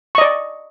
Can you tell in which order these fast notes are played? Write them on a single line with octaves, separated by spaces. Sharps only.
C#6 D#5 D5